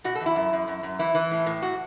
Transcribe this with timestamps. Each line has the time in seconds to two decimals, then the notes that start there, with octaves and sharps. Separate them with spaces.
0.04 B2 F#4
0.15 A4
0.20 E2
0.26 E4
0.36 F#2
0.53 F#2
0.68 F#2
0.83 F#2
0.99 E3 E4
1.15 E3
1.31 A2
1.46 A2
1.62 F#4